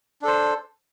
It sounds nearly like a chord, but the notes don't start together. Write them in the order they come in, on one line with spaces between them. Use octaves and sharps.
D4 A4 C5